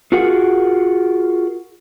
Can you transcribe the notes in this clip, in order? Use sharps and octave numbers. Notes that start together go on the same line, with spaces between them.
F4 F#4 G#4 A#4 F#5